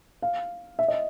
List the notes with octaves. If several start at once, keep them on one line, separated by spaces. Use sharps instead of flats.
F5
E5
D#5